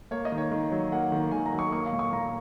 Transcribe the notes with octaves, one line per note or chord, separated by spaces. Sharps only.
A#3 C#5
D#5
D#3
C#5
D#3
F#3
A#3 F#5
D#3
D#3 G#5
A#5
F#3
C#6
A#3 C#6
F5
A#2
C#6
A#2 A#5